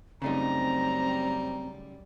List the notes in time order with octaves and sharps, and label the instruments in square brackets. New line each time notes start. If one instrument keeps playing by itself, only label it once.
[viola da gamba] F#2 G3 [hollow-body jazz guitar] C#3 A3 D#4 [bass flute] C4 [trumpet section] A#5